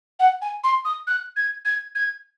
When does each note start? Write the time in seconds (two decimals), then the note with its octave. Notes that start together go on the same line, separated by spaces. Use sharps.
0.19 F#5
0.42 G#5
0.64 C6
0.85 D#6
1.07 F#6
1.36 G#6
1.65 G#6
1.95 G#6